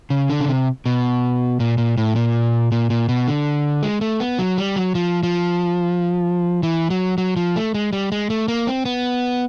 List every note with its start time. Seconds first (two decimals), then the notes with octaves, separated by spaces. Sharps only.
0.10 C#3
0.30 D3
0.41 C#3
0.48 C3
0.86 B2
1.60 A#2
1.78 A#2
1.97 A2
2.16 A#2
2.72 A#2
2.90 A#2
3.09 B2
3.27 D3
3.83 G#3
4.01 A3
4.20 B3
4.39 F#3
4.58 G3
4.76 F#3
4.95 F3
5.23 F3
6.63 E3
6.90 F#3
7.18 F#3
7.36 F3
7.56 A3
7.74 G#3
7.93 G3
8.12 G#3
8.30 A3
8.48 A#3
8.67 C4
8.85 B3